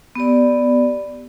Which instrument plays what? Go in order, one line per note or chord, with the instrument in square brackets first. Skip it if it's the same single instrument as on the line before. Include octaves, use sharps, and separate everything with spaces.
[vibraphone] B3 G4 D5